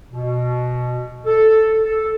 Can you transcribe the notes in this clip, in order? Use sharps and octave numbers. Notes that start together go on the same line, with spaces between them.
B2
A4
A4